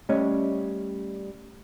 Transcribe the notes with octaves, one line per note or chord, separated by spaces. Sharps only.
G3 A3 C#4 C#5 D#5